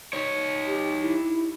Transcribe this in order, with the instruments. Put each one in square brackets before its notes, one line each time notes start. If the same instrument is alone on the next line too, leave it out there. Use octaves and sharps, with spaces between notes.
[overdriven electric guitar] D#4 C#5
[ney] G4
E4